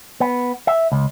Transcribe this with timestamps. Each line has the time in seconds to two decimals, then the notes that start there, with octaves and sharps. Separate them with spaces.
0.20 B3
0.67 E5
0.92 C#2